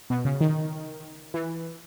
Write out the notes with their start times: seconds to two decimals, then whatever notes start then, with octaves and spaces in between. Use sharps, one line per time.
0.10 B2
0.25 C#3
0.41 D#3
1.34 E3